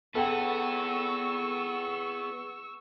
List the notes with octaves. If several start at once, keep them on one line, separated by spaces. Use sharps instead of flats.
B3 G#4 A4 B4 F#5 G5 C#6 E6